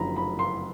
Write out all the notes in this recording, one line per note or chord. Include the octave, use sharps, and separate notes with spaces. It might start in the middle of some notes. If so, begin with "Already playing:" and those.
Already playing: F#1 F#2 D3 F3 A#5 B5
B5
C6